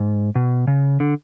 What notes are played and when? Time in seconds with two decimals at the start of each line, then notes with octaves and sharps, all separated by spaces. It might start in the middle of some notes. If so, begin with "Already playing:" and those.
Already playing: G#2
0.35 B2
0.67 C#3
1.00 D3